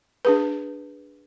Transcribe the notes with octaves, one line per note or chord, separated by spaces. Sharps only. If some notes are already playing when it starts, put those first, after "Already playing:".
D4 G#4 B4